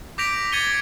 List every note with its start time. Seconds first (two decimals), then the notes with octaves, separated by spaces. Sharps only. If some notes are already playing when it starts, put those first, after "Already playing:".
0.18 D6 G6 A#6 B6 D7 F7
0.52 D6 G#6 A6 C#7 D#7 G7